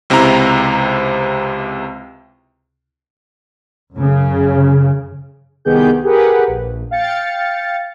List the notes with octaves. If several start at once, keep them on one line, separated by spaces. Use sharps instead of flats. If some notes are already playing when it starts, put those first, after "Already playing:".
C#2 C3 C4 E4 A#5
F#2 C#3
C2 D#3 B3 G4 G#4 G6
G4 G#4 A#4 B4 F#5
A#1
F5 G5 A6 C#7